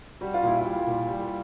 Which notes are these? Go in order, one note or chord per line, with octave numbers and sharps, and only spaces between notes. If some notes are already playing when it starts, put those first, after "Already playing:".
G3 F#4
F4
A#2 E4
G3 F4
A#2
G3